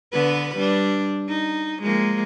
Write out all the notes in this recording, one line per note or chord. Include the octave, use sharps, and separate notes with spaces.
D3 B3 B4
G3 D4
D#4
F3 G#3 A#3